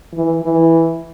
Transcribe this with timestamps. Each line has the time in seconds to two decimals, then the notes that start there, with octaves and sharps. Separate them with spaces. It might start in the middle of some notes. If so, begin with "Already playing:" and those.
0.13 E3
0.42 E3